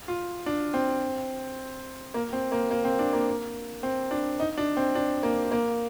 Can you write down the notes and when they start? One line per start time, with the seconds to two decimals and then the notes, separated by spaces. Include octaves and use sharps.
0.08 F4
0.46 D4
0.74 C4
2.14 A#3
2.33 C4
2.52 A#3
2.71 A#3
2.85 C4
2.99 D4
3.13 A#3
3.83 C4
4.11 D4
4.40 D#4
4.58 D4
4.77 C4
4.95 D4
5.23 A#3
5.52 A#3